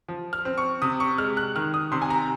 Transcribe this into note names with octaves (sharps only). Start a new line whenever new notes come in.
F3
F6
C4
C#6
C3 D#6
C#6
G#3 F6
F#6
D#3 F6
D#6
C3 C6
G#5
A#5